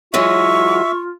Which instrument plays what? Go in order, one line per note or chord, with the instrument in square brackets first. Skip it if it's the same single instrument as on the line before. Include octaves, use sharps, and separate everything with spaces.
[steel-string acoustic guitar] E3 F#3 G#3 [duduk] F4 [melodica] E5 [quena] C#6